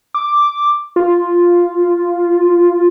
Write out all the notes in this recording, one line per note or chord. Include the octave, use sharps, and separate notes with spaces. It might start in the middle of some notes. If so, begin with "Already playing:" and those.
D6
F4